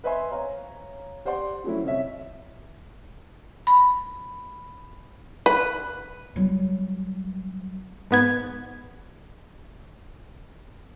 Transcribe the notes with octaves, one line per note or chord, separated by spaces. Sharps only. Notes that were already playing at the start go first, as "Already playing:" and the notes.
B4 C5 D#5 E5 G#5 C6
C#5 F5 A#5
G4 C5 D5 F#5 C6
F3 F#3 A3 C#4 E4
C2 C#5 D#5 E5
B5
B4
F#3 G3
G#2 B3 G#6